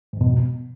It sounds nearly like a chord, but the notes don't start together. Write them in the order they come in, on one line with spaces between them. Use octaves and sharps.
G#2 F2 B2